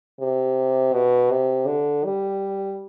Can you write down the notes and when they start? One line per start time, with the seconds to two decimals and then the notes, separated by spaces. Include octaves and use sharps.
0.20 C3
0.93 B2
1.31 C3
1.67 D3
2.05 G3